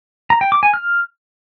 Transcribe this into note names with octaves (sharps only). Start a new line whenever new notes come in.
A#5
G5
D6
G#5
F6